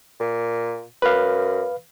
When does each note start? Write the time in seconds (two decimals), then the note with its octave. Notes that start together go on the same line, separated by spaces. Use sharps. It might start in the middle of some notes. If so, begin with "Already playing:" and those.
0.20 A#2
1.02 F#2 B4 F5